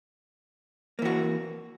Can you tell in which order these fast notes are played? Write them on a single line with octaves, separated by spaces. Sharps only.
A#3 E3 F#4